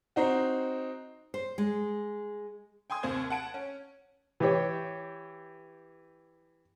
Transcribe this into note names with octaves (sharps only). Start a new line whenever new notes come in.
C4 D#4 F#4
C5
G#3
G5 G#5 C6 D#6 G#6
D#2 C3 C5 G#6
F#5 A5 D7
C#4
E3 G4 C#5